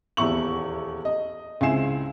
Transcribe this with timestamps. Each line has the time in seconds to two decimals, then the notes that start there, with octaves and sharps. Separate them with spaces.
0.17 D#1 E2 E4 C#6 F#7
1.05 D#5
1.61 C#2 C4 E4 G#5 C7 E7